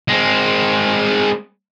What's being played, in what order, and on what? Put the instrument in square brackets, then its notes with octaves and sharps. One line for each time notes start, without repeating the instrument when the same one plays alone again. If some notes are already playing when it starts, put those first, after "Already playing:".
[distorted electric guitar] G#3 C4